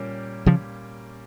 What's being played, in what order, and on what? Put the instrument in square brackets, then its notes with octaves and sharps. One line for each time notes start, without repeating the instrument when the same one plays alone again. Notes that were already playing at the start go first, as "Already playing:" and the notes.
Already playing: [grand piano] A#2 G3 A#3 C#4 G4
[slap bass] C#3 F3